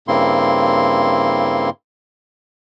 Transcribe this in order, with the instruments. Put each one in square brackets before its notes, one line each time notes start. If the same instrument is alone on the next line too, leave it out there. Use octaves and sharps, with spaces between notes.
[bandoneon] G2 C#3 A#3 C4 E4 C6